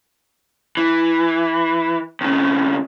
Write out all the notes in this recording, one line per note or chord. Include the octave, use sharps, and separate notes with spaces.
E3
D#2 C#3